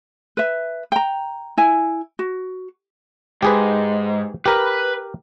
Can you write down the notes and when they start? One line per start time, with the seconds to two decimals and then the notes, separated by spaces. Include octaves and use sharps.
0.37 B4 E5
0.92 G5 A#5
1.58 E4 G#5
2.19 F#4
3.42 G#2 G4 G#4 B4
4.46 G4 A#4 B4 B5